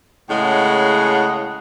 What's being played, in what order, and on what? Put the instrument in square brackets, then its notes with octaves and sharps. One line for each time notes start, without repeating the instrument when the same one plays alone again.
[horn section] A2 C#3 G#3 F#5